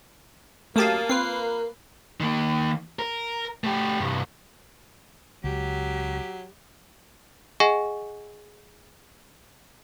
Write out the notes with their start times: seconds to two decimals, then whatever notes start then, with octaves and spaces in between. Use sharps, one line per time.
0.76 F#2 A3 A#3 G4 F5 A5 D#6
1.09 C4 F4 A#4 B4 C7
2.20 D#3 A#3
2.99 A#4
3.64 A3 G4
4.00 C2 G2
5.44 C#2 F#3 G4
7.60 G#4 D#5 F#5 G#5 C#6 A#6